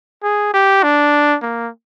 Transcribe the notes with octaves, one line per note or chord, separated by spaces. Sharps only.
G#4
G4
D4
A#3